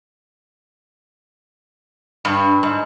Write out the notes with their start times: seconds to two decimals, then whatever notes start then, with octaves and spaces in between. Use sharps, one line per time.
2.25 G2
2.63 G#2